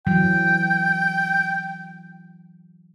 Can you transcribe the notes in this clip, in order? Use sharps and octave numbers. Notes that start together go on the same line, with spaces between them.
E3 F#3 G5